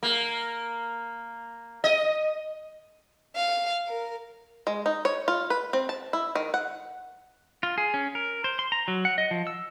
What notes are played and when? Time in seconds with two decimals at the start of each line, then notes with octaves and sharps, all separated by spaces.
0.03 A#3
1.84 D#5
3.36 F5
3.86 A#4
4.67 G#3
4.86 D#4
5.05 C#5
5.28 F4
5.50 B4
5.73 C4
5.89 A5
6.13 E4
6.35 D#3
6.54 F#5
7.63 F4
7.78 G#4
7.94 C#4
8.15 A#4
8.44 C5
8.59 C6
8.72 A#5
8.88 F#3
9.05 F#5
9.18 D#5
9.31 F3
9.47 E6